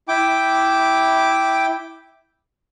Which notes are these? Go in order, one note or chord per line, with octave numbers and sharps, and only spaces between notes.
E4 G5 D6